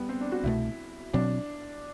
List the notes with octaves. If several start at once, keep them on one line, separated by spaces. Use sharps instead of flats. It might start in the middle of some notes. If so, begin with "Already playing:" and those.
Already playing: G3 B3
C4
D4
F#4
C2 B2 A3 E4
B2 F#3 C4 D4